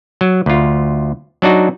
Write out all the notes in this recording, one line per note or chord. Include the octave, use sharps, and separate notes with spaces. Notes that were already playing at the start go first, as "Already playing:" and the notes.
F#3
D2 F4
F#3 D4 D#4 F#4